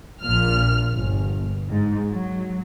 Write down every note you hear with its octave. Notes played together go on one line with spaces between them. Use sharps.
A#1 A#2 F6
G1
G#2
F#3